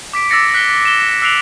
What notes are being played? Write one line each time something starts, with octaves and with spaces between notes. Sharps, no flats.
D6 B6 D7
D6 E6 A6 A#6 C#7
F#6 B6 C#7 G7
E7 G7
E6 F#6 C7 D7 F7 F#7